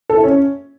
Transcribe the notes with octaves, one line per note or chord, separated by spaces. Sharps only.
A4
E4
C#4